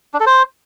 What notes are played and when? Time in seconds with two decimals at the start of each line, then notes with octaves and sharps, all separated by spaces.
0.14 D4
0.20 A4
0.26 C5